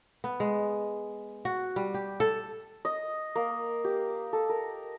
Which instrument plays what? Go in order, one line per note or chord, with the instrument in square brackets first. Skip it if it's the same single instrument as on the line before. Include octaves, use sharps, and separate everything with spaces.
[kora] B3
G#3
F#4
G3
G4
A4
[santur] D#5
A#3
G4
A4
A#4